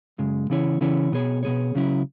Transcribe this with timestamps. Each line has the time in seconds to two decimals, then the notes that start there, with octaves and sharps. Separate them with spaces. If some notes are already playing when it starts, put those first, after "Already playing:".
0.18 F#2 C#3 G#3
0.50 C#3 E3 C#4 E4 C#5
0.81 C#3 E3 C#4 E4 C#5
1.12 B2 B3 G#4 C#5
1.43 B2 B3 G#4 C#5
1.75 C#2 C#3 F#3 C#4 E4